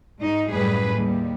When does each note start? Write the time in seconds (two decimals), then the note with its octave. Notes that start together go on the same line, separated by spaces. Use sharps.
0.20 G#2 D#4
0.49 F#2 A2 G3 G#4 B4
0.95 D#2 G3